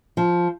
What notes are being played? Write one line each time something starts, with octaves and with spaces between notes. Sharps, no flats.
F3